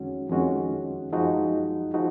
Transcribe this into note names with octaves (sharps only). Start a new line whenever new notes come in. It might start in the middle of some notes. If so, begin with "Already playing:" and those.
Already playing: F2 D#3 G#3 C#4 F#4
F2 D#3 G#3 C#4 F#4
F#2 F3 G#3 D#4 F#4
F3 G#3 D#4 F#4